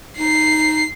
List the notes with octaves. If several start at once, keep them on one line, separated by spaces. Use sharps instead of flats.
D#4 C7